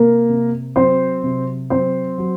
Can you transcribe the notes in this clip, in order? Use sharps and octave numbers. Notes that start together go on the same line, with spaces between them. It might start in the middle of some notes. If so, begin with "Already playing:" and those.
Already playing: C3 A#3 A#4
C3
F#3 C4 C5
C3
F#3 C4 C5
F#3